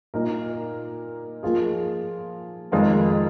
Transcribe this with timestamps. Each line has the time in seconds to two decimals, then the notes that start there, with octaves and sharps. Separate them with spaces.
0.14 A#2 A#3 D#4 A#4
1.43 F3 A#3 F4 G#4
2.72 F2 D#3 G#3 F4 A#4